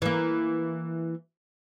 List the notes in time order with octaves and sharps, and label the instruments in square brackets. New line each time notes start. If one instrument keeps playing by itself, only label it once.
[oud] E3 A#3